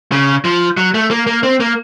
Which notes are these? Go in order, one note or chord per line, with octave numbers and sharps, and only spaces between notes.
C#3
F3
F#3
A3
A#3
A#3
C4
A#3